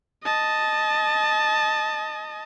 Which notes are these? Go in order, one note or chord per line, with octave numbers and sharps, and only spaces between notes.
D#5 A5